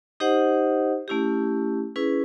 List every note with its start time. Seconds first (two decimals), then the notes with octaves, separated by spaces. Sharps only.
0.20 D#4 G4 C5 D#5 F#5
1.08 A3 C#4 E4 G4
1.96 C#4 E4 G#4 B4